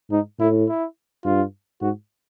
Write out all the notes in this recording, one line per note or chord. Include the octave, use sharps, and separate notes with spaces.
G#2 D#4
A2 E4
E4
G2 F4
G#2 F#4